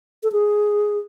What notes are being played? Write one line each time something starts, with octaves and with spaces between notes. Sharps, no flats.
A4
G#4